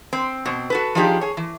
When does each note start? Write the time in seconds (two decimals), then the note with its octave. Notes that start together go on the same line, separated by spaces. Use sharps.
0.13 C4
0.46 B2 C4
0.70 F#4 A4 B4
0.95 F3 D4 D#4 F4 G4 G#4
1.21 G#4 C#5
1.37 E3